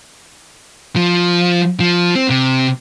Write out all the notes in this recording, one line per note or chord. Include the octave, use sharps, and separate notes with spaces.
F3
F3
C4
C3